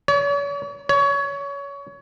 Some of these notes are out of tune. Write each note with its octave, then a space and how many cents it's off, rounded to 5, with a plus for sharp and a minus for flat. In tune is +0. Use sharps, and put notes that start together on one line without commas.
C#5 +45
C#5 +25